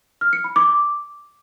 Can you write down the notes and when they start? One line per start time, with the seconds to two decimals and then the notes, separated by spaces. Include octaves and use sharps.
0.21 F6
0.33 C#7
0.44 B5
0.56 D6